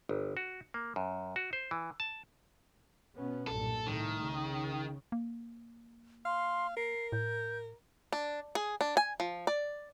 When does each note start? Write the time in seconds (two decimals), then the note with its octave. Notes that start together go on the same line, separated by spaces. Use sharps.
0.09 G1
0.37 F#4
0.74 A#3
0.96 F#2
1.36 F#4
1.53 C5
1.71 E3
2.00 A5
3.16 B2 B3 C#4
3.47 B1 G2 A#2 A4
3.87 C2 A2 D#3 A3
4.24 C#3
5.12 A#3
6.26 F5 C6
6.77 A#4 C7
7.12 A2 G6
8.13 D4
8.55 G#4
8.81 D4
8.97 G#5
9.20 F3
9.47 D5